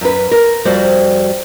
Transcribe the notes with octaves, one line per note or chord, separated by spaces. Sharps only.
F#2 B4
A#4
F2 G3 F#4 C5 D5